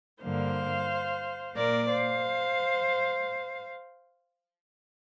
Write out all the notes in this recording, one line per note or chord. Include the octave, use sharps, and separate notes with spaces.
G2 D3 A#3 C5 F5
A#2 A#3 A#4 D5
C5 F5